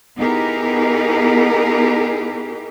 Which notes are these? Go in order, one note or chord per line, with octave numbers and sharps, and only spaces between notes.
B3 D#4 E4 G4 G#4 A#4